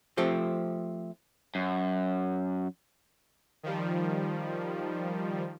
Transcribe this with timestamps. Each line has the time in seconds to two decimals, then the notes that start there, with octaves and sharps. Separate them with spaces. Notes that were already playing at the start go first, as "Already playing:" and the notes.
0.17 F3 A3 C4 G4
1.55 F#2
3.63 D#3 F3 G3